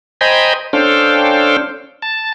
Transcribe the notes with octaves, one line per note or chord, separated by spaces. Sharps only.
C5 D#5 G5 G#5 A#5 B5
C#4 D4 A4 C5 F5 G5
A5